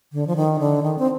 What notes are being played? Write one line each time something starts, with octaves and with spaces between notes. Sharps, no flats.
D3
F3
D#3
D3
D#3
C4